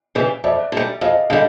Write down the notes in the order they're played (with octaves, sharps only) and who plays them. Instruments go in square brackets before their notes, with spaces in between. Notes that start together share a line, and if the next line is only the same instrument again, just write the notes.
[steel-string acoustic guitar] C#3 E3 G3
[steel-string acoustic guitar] F2 [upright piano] D5 E5
[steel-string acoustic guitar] D3 G3
[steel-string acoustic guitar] F2 [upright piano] D#5 F5
[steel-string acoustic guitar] D3 G3 [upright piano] D#5 F5